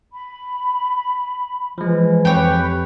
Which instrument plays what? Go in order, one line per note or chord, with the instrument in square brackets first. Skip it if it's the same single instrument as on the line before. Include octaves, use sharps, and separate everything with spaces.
[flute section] B5
[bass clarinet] E3 [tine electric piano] F3 G#3
[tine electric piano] F2 [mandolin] G4 C#5 [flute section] B4 G5 B5